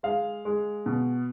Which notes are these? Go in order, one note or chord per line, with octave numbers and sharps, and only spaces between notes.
G#3 F5
G#3
B2